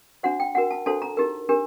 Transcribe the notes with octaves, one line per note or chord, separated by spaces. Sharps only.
D4 F#4 C5 F#5
G5
D4 F#4 A#4 F#5
A5
D4 F#4 A4 C5 A5
A#5
D#4 G4 A#4
D4 G4 A#4